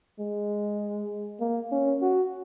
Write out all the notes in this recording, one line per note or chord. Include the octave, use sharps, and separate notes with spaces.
G#3
A#3
C#4
F#4